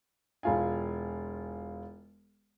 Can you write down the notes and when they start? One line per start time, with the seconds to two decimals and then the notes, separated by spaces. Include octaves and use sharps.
0.43 E1 F4 G#5